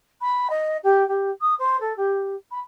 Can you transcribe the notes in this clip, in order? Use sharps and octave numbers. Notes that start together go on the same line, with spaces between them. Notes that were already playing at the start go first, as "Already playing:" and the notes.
B5
D#5
G4
G4
D#6
C5
A4
G4
B5